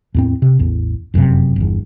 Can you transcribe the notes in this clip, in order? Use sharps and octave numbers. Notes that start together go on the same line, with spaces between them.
E2 A2 C4
C3
A1 E2
F1 F#2 A2 C3
G1 E2